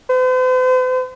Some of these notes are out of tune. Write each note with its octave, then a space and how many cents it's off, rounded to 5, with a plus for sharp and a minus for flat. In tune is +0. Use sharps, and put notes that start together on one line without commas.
C5 -45